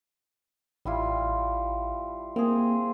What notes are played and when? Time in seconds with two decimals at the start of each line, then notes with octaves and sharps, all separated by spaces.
0.85 A1 G3 E4 F4
2.36 A#3 C4 G#4